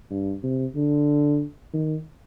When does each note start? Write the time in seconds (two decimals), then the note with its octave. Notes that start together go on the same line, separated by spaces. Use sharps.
0.11 G2
0.43 C3
0.75 D3
1.73 D#3